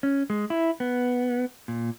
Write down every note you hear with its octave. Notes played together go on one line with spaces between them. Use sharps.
C#4
G#3
E4
B3
A#2